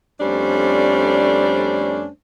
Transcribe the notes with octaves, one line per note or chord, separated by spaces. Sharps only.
F2 G3 A3 C#4 D4 C5